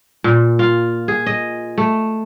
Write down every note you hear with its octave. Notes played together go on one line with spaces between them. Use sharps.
A#2
F4
G#4
D#5
A3